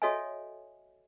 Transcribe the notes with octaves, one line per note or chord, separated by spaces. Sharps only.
F#4 A4 C#5 D#5 E5 G#5